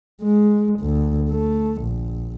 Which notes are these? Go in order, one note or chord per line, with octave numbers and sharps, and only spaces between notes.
G#3
D2
A3
A#1